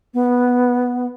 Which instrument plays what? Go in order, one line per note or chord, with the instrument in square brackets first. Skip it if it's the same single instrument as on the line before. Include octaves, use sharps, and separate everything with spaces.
[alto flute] B3